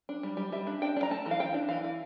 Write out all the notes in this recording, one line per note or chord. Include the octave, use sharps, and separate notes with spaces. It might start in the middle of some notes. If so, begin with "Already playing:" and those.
D4
G3
G3
G3 E5
D4
D4 G5
D4
A#5
A3 A5
E3
F5
E3 G5
D4
E3 F5
E3